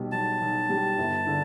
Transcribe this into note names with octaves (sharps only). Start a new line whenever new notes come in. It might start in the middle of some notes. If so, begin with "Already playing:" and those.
Already playing: B1 B2 G3
B1 A5
B1
G3
G1
D3